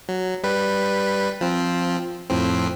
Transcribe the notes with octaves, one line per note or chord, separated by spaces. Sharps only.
F#3
G3 B4
F3 C4
F2 A2 C4